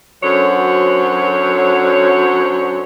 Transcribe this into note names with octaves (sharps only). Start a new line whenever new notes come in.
F#2 D3 F#3 C5 C#5